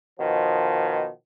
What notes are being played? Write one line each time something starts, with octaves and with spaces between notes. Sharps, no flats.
B2 D#3 F3